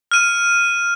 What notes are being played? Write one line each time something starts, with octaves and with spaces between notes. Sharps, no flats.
F6 D#7